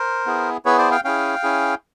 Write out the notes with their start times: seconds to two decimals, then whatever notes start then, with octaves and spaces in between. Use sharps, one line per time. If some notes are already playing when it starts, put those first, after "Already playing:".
Already playing: A#4 C5
0.26 B3 E4 G#4
0.65 B3 E4 G#4 B4 C#5
0.78 C5 D5
0.91 F5 G5
1.04 C#4 E4 G#4 F5 G5
1.43 C#4 E4 G#4